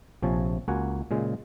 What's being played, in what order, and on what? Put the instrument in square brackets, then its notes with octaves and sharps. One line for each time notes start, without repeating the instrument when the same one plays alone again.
[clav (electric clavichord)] A#1 C3 F3 C#5 G#5 A5
C#2 A#3 F#4 F#5 G#5
A#2 C#3 G#3